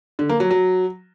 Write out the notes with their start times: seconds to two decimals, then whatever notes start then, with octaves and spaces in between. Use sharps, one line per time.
0.19 D3
0.29 A#3
0.40 F#3
0.51 F#3